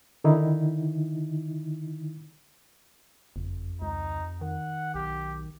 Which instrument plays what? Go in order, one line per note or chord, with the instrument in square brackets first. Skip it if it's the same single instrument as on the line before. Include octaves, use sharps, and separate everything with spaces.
[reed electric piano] D3 D#3 D#4 E4
[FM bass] F#1 [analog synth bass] F2
[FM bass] C#2 [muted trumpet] D#4
[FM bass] D#3 [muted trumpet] F#5
[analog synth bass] B1 [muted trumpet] G4